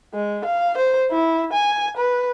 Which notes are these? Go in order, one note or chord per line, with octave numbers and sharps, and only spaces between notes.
G#3
F5
C5
E4
G#5
B4